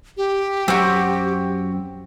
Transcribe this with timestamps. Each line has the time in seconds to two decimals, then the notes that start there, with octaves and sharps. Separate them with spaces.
0.17 G4
0.68 F#2 C4 F#4